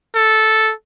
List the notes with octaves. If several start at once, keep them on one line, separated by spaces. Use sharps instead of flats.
A4